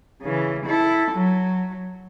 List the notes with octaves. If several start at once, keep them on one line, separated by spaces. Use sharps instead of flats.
C#3 E3
E4 A4
F#3